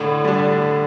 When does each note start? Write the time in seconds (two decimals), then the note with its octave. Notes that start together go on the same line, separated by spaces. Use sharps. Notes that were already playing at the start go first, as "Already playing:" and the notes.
Already playing: A2 D3
0.25 G3 D4